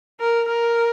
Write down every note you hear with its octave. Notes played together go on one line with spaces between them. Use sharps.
A#4
A#4